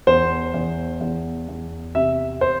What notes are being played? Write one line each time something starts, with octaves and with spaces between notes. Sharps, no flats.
E2 C5
E2
E2
E2
C3 E5
C5